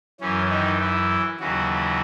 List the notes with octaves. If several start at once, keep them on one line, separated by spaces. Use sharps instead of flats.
F#2 E3 C#4
D#3 D#4
E3 E4
D#2 C#3 E3 F#3 F#4